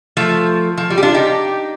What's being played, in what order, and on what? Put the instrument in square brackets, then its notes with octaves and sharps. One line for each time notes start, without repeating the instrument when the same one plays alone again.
[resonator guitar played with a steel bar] F3 A3
F3
G3
G4
D4 F4
D#4 G4